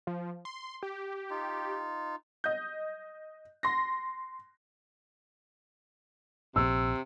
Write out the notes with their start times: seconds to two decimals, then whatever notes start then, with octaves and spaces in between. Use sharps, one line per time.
0.07 F3
0.45 C6
0.83 G4
1.30 D#4 F4
2.44 D#5 G6
3.63 C6 A#6
6.56 A#1 C3 E6